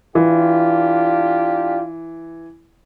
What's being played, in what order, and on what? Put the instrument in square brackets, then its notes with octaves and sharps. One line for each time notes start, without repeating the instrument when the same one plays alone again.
[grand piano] E3 [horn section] D4 F4 G4